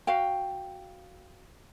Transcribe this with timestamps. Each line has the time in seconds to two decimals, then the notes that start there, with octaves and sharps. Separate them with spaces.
0.07 F#4 F5 G5